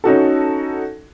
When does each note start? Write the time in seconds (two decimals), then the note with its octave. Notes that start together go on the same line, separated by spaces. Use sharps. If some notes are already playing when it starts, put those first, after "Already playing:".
0.04 C#4 D#4 F#4 A4